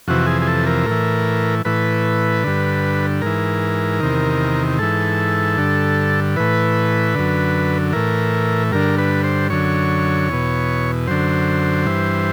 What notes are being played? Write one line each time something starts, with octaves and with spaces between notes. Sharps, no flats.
F2 C3 E3 F#4
G#4
G#4
A4
A#4
A2
E3
A2 E3 B4
G2 D3
G#2 E3 A#4
E2 C3 D#3
G#2 E3 A4
G2 D3
A2 E3 B4
F#2 D3
A2 E3 A#4
G2 D3 A#4
B4
C5
F#2 D3 C#5
E2 B2
F#2 D3 C5
G2 E3